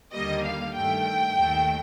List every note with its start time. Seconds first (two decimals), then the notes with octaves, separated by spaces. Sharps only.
0.13 D#2 D3 G3 A#3 D#5
0.44 F5
0.75 G2 D#3 A3 G5
1.37 D#2 D#3 A3